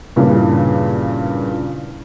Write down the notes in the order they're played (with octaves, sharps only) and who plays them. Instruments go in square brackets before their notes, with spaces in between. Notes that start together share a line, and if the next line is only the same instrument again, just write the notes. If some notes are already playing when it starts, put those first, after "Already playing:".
[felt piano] G2 A#2 C#3 E3